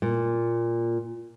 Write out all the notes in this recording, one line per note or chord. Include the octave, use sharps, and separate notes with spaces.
A#2